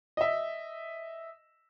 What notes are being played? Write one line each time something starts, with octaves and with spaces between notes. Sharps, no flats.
D#5 E5